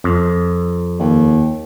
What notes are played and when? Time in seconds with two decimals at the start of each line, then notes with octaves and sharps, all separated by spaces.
0.04 F2
0.99 D#2